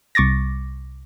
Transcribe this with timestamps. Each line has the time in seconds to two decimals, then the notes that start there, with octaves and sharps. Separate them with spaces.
0.15 C2 C#6 D6 A6 A#6